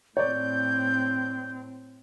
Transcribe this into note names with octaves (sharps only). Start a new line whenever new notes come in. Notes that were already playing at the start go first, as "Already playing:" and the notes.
A2 C4 C#5 D5 G6